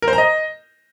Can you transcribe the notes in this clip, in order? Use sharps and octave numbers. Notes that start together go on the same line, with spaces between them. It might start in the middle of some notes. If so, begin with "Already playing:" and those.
A#4
C5
A#5
D#5